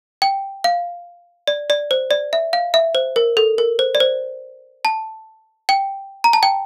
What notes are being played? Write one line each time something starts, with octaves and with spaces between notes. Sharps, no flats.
G5
F5
D5
D5
C5
D5
E5
F5
E5
C5
A#4
A4
A#4
C5
D5
C5
A5
G5
A#5
A5
G5